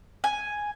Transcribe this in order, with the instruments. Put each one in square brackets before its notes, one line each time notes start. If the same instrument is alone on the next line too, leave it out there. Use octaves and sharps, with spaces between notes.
[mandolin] G#5